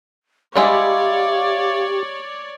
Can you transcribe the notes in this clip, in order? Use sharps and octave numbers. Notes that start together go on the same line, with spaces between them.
G3 G#3 E4 G4 C#5 D5 F5